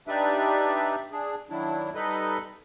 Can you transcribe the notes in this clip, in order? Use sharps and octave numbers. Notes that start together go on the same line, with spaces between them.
D4 D#4 G4 B4 D5 E5
D4 G#4
D#3 F#3 D4 E4
G3 D#4 A4 B4 D#5 B5